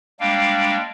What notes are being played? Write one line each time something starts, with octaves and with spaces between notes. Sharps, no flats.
G3 G#3 A#3 D4 F5 G5